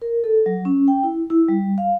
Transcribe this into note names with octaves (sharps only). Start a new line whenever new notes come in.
A#4
A4
F#3
C#4
G5
E4
E4
G3
F5